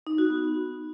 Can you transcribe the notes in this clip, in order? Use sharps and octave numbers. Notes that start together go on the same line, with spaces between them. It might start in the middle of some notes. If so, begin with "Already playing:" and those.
D#4
F#4
B3